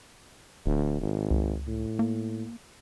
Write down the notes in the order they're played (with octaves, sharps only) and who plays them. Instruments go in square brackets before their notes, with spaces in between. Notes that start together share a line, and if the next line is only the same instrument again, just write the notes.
[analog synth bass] D1 [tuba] D2
[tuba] G#1
[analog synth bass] C#2
[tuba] A2
[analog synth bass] A#3